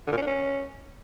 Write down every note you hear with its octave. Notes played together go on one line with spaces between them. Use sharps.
D3
A#2
C#4
D4
C#4